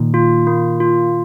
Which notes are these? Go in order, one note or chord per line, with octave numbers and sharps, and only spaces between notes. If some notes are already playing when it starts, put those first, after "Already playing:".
Already playing: A#2 D#3
F4
A#3
F4